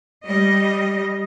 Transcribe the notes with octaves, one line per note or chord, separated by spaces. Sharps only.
G3 D#5